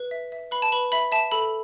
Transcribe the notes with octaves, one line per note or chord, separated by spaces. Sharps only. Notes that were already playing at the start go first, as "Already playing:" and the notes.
Already playing: B4
E5
E5
B4 B5
A5
B4 B5
E5 B5
E5 A5
A4 B5